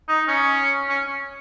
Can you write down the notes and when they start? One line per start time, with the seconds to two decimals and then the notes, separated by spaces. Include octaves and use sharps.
0.08 D#4
0.28 C#4
0.89 C#4